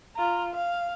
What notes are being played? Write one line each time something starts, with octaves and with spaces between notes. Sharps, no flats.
F4 A#5
F5